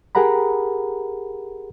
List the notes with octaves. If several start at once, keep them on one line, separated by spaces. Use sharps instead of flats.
G4 G#4 A#4 F#5 A#5 B5